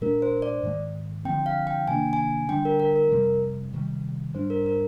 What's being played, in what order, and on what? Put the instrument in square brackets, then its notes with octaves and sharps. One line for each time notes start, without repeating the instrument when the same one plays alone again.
[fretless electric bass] A#2 G#3 D4 [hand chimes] A#4
[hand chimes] C5
D5
[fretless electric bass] G#2 D#3 G#3
[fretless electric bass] G#3 C4 [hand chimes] G5
[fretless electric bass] D3 F3
[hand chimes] F5
G5
[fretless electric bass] C3 D#3 A#3 D4 [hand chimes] G#5
[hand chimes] G#5
[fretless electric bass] D3 G3 D4 [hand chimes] G5
[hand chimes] A#4
A#4
A#4
[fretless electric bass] F2 C3 G3
C3 D#3 G3
[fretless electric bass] G#2 G3 D4 [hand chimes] C5
[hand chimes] A#4
A#4